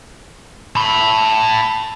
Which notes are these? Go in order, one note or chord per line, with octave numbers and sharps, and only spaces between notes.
A5 B5